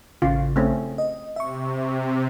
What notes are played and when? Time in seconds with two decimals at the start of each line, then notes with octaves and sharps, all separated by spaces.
0.22 A1 C#3 F4
0.56 A3 C4 C#4
0.98 D#5
1.36 C3 E5 C#6